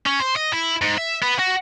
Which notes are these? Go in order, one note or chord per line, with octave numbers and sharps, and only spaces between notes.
C#4
C5
D#5
E4
G#2
E5
B3
F#4